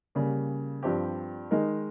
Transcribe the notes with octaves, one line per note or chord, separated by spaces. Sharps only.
C#3 G3 A#3
G2 F3 C4 G4
D#3 G#3 D#4 A#4